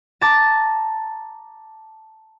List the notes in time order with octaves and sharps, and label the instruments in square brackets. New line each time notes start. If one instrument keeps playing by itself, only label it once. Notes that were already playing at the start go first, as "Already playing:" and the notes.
[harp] A5 A#5 D6 A6